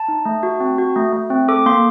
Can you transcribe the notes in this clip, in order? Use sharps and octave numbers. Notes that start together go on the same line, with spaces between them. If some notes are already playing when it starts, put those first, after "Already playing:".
Already playing: A5
D#4
A3
F#4
C4
F#4
A3
A3
C4
A4 D6
A#3 C6